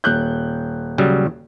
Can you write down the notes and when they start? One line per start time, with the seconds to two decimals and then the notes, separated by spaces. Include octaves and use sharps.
0.04 D#1 F#6 G6
0.98 C#3 F#3 G3